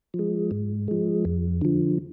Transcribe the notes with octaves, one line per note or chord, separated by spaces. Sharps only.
F3
G#3
G#2
F3 G#3
F2
D3 F3